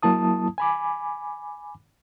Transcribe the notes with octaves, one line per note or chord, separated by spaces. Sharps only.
F#3 A#3 E4 A5 D#6
G#5 B5 D6